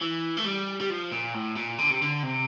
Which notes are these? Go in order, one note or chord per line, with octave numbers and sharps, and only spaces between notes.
E3
A3
G3
G3
F3
A#2
A2
A#2
D3
C3
D3
C3